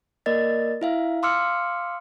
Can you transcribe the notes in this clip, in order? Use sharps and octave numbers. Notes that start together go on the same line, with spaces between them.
A#3 A#4 D5 D#5 A6
E4 E5 F5
F5 C6 D6 E6 F6 C#7